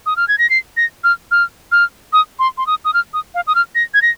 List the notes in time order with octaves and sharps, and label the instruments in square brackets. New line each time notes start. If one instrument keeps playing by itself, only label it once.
[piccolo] D#6
F6
G#6
A#6
C7
A#6
F6
F6
F6
D#6
C6
C6
D#6
D#6
F6
D#6
F5
D#6
F6
A#6
G#6
A#6